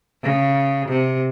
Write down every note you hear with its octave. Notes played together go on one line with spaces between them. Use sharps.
C#3
C3